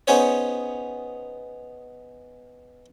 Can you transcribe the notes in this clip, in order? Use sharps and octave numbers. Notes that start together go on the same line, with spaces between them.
B3 C#4 D#4 G#4 C5 C#5